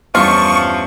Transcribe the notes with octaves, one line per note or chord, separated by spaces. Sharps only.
E2 G2 F3 C#4 F4 C#6